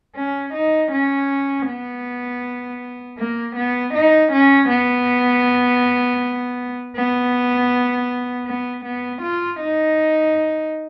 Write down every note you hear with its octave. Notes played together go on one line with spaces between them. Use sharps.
C#4
D#4
C#4
B3
A#3
B3
D#4
C#4
B3
B3
B3
B3
F4
D#4